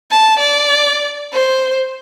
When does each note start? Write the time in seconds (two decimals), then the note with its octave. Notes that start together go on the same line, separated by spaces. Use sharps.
0.11 A5
0.39 D5
1.33 C5